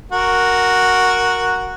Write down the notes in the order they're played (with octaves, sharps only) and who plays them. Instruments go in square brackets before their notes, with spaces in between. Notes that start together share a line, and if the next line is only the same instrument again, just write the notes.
[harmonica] F#4 A#4